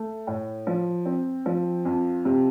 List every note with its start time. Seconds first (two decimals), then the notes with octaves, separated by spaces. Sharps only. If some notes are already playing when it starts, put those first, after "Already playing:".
Already playing: A3
0.27 A2
0.67 F3
1.05 C4
1.46 F3
1.85 F2
2.25 C3